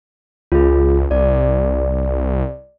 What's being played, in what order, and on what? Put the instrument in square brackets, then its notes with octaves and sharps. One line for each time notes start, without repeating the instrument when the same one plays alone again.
[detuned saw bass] C#2 [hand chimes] F4 G#4
[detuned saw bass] C2 [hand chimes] D5